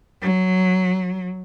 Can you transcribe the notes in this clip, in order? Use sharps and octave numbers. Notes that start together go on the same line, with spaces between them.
F#3